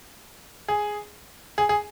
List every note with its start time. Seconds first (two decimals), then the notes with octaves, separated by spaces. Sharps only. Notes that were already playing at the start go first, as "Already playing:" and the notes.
0.68 G#4
1.58 G#4
1.69 G#4